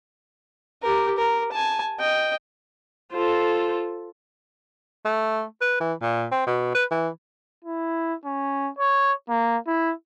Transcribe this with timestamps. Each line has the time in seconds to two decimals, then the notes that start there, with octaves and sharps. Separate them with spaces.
0.83 G4 A#4
1.17 A#4
1.52 G#5 A5
2.00 D#5 G5
3.13 F4 A4 C5
5.05 A3
5.61 B4
5.80 E3
6.01 A#2
6.32 C4
6.47 B2
6.75 B4
6.91 E3
7.64 E4
8.25 C#4
8.78 C#5
9.29 A#3
9.67 E4